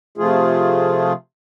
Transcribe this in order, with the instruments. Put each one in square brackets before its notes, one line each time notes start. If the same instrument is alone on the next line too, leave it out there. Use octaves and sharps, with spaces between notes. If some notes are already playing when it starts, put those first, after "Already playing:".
[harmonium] C3 F3 A3 F4 G#4